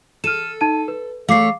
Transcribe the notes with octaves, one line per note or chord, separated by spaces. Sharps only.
A4 F6 D#7 E7
D#4 A5 D#7
B4
A3 C#5 F5 D6 C7